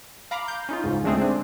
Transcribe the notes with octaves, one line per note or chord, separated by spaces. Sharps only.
F5 A#5 B5 D6
G6
C#4 D#4 F4
C#2 G#2
D3 G#3 A3 C4 G#4
G#3 C4 D4